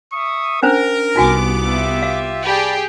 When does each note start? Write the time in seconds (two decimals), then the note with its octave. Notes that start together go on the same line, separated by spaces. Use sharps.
0.13 E5 C#6 D#6
0.63 C#4 D4 A#4 C5
1.16 C2 B3 D#4 F#4 G#5 D6
1.64 F4 G4 E5
2.03 F5
2.46 G4 G#4 D5 A5 B5